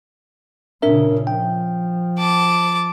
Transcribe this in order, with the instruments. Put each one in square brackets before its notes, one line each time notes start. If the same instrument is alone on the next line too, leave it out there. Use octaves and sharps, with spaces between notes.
[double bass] A#2 C#3 [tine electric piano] D4 A#4 E5
[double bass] F3 [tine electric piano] G5
[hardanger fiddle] A5 D6